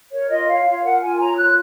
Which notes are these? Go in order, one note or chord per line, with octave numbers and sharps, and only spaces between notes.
A#4 C#5
F4 D#5
C#5 F5
F4 F5
A#4 F#5
F4 G#5
C#5 A#5
F4 F#6